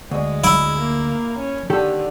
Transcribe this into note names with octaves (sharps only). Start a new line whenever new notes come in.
D2 G#3
E4
A#3
C#4
D3 D#3 G4 A4